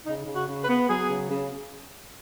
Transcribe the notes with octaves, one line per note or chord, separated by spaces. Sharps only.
C#3 D#4
C#3
F#4
C#3
B4
B3
F#3 G#4
C#3
C#3